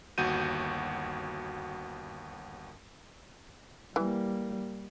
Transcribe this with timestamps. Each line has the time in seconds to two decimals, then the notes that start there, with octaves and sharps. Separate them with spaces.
0.18 G1 D#2 F#4 G6 D#7
3.96 E3 G3 A#3